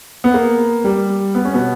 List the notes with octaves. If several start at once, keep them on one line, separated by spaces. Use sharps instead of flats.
B3
A#3
G3
B3
C#4
B2 B3